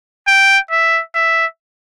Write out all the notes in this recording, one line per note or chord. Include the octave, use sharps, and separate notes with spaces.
G5
E5
E5